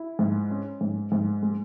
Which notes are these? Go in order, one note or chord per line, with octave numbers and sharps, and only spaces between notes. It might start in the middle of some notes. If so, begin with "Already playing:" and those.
Already playing: E4
G#2
C#4
G#2
G#2
G#3